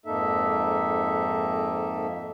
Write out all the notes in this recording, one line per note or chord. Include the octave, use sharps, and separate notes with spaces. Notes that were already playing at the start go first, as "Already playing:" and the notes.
F2 G#2 A#3 D#4 A4 E5